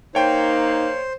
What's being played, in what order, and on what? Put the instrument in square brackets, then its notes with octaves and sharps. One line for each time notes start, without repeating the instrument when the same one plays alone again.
[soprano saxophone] A#3 [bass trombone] D#4 [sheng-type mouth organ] C5 [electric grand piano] C#5 G5